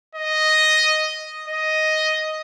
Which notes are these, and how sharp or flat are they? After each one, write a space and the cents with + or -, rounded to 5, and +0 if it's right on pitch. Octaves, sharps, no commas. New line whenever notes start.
D#5 +0
D#5 +5